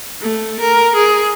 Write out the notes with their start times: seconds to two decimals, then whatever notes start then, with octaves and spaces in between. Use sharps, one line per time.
0.21 A3
0.60 A#4
0.96 G#4